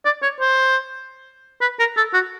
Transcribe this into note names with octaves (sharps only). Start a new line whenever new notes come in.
D5
C#5
C5
B4
A#4
A4
F#4